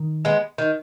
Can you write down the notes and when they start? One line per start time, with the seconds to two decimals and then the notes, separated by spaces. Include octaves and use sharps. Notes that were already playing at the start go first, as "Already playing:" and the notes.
Already playing: D#3
0.25 G#3 B3
0.58 D#3